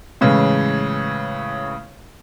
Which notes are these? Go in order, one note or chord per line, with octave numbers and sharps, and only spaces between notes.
A2 C#3 E3 G#3